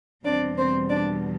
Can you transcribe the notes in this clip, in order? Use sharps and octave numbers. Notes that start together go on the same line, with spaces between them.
E2 B2 G3 C4 D4 D5
C4 C5
D4 D5